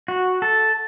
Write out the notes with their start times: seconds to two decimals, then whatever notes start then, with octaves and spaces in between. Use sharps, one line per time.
0.08 F#4
0.42 A4